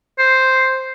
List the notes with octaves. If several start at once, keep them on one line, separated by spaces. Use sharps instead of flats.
C5